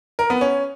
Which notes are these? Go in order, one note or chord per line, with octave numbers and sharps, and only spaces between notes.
A#4
B3
C#4